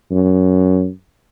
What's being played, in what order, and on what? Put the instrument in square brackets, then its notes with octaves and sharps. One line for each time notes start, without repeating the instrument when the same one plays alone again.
[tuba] F#2